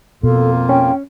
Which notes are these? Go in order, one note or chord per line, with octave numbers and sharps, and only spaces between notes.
F2 B2 A#3 F4 A4
C#4 G5